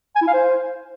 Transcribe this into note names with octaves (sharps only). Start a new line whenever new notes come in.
G#5
E4
F5
C5